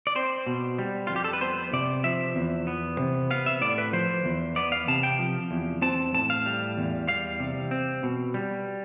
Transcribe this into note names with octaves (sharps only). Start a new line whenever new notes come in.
D5
C4 C5
B2
G3
F2 F4
G4
A4
B4
B3 C5
C3 D5
F3 E5
E2
B3
C3
B3 F5
E5
A2 D5
B4
F3 C5
E2
B3 D5
F5
C3 A5
G5
F3
E2
C4 A5
A2 A5
F5
G3
E2
G3 F5
C3
C4
B2
G3